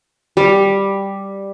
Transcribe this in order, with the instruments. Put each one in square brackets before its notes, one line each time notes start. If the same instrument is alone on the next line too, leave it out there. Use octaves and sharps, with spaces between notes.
[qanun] G3